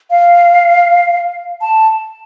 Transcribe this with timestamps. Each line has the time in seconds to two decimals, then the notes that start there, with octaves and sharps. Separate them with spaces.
0.10 F5
1.61 A5